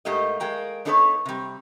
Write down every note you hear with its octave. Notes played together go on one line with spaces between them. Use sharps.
G#2 A3 A#3 G4 D#5
G#3 A#3 G5 A#5
B3 D4 D#4 A4 B4 C#5
C3 G3